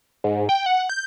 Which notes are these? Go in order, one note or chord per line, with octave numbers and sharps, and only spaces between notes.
G#2
G5
F#5
G6